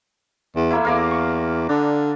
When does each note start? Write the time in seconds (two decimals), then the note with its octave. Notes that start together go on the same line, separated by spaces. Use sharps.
0.56 E2
0.71 A3 A#3 E4
0.85 E2 F5 A#5 D6
1.11 C#6
1.69 D3 D4